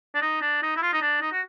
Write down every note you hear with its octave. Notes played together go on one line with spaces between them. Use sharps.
D4
D#4
D4
D#4
E4
F4
D#4
D4
D#4
F#4